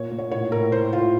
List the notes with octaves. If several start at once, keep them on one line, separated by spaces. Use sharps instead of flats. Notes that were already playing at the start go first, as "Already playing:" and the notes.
Already playing: A#2 C#5
A#2
C#5
A2 C#5
A2 A#4
A2 C5
A2 F4